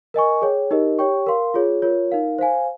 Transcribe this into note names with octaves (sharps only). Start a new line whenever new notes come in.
A#4 D#5 G#5 C#6
G#4 C#5 G5
D#4 G4 A#4 D#5
G4 C#5 G5 C#6
A#4 F5 C6
F4 G#4 C#5
F4 A#4 C#5
D#4 A#4 F5
C5 F5 G#5